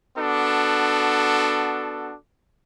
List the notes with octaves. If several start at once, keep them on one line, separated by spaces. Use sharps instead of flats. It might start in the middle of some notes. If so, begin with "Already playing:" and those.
B3 D4 F#4 A4